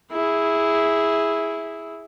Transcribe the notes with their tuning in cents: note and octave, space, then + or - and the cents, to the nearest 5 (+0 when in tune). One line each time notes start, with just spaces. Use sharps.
E4 -5 G#4 -5